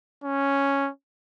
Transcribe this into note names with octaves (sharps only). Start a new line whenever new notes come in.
C#4